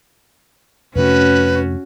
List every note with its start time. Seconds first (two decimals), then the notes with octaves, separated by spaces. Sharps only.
0.96 F2 C3 A3 C#4 F#4 B4